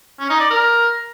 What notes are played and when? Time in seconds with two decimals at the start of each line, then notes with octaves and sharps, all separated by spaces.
0.20 C#4
0.30 D#4
0.40 D5
0.50 A#4